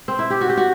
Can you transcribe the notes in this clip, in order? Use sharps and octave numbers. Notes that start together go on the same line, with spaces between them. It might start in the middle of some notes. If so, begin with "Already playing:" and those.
C4
E4
G4
F#4
G4
F#4